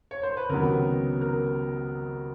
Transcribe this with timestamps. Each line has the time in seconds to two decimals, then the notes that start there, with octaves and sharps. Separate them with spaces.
0.11 C#5
0.23 C5
0.37 B4
0.49 C#2 C3 D#3 F#3 B3 A#4
1.21 A#4